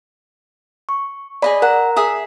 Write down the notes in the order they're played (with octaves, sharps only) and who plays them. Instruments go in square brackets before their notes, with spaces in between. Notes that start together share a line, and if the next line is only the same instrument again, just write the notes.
[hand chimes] C#6
[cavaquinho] G#4 D#5 B5 [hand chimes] D5
[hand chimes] A#4 A#5 [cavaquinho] F#5
[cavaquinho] G#4 E5 D#6